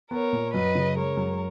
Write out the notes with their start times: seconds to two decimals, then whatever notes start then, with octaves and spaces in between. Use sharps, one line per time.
0.11 B3 A#4 C#5
0.33 A#2
0.53 F#2 B4 D#5
0.75 C#3
0.96 G#3 A#4 C#5
1.17 F#2